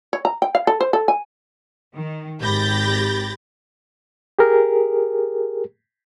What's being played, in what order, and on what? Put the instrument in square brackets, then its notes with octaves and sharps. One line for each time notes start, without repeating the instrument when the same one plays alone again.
[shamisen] C#5
A#5
G5
F5
A4
C5
A4
G#5
[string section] D#3
G#1 G4 B5 G6 A6 A#6
[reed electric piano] G4 G#4 A#4